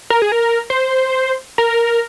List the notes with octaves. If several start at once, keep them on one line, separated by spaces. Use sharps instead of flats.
A#4
G#4
A#4
C5
A#4